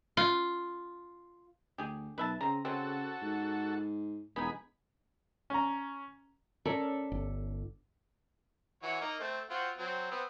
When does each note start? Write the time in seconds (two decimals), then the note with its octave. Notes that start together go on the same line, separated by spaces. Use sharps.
0.17 F4
1.78 D2 G4 G#4
2.18 B1 B4 E5 A5
2.41 C#3 C4 A#5
2.65 C#3 C4 C#4 F#4 A4
3.22 G#2
4.36 E1 B3 D#4 G#4 B5
5.50 C#4 A#5
6.65 C#4 A4 A#4 D5 E5
7.12 G1
8.83 E3 F#4 C#5
9.01 A#3 D#4
9.20 A3 C4
9.50 C4 F4 F#4
9.78 F#3 C4
10.11 B3 C4